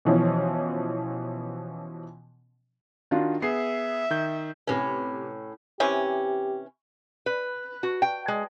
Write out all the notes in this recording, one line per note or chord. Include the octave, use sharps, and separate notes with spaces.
B2 E3 F3 C#4
D#3 D4 F4 F#4
B3 G#4 E5 C7
D#3 G6
A2 C3 C#4 B4
C3 E3 C#4 G4
B4
F#4
G5
G#3